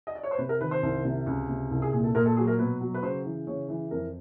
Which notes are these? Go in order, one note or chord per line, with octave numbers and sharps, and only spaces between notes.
D#5
D5
C#5
C5
C3 B4
A#4
D#3 B4
C5
C2
C3
C#2
C3
C2
G#4
A#2 G#4
A4
A#2 A#4
A4
F#3 G#4
A#4
B2 B4
F#3
B4
C#3 C5
E3
C#3 C#5
E3
F2 A#4